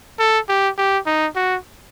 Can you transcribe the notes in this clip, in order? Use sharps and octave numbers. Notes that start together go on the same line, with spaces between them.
A4
G4
G4
D#4
F#4